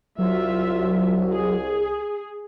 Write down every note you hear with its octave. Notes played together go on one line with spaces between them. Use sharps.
C2 F#3 F4 E5
G#4